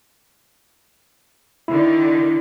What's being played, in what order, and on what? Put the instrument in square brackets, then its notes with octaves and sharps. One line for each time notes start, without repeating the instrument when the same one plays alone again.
[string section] D3 D#3 [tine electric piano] E4